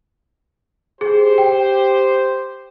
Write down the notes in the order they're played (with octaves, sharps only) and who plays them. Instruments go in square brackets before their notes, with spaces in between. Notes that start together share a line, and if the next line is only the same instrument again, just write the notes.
[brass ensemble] G4 C5 [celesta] G#4
[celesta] G5